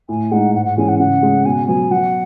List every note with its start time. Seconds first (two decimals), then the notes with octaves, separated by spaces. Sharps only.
0.09 A2 G#5
0.31 G#3 D#4 F#5
0.54 G#2 F#5
0.65 F#5
0.77 E3 G#3 C#4 G#5
0.88 F#5
0.99 C#3 F#5
1.23 G#3 C#4
1.45 B2 G#5
1.67 F#3 B3 G#5
1.91 F#3 F#5